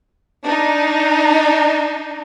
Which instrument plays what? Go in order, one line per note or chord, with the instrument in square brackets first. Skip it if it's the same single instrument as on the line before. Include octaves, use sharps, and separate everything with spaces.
[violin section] D4 D#4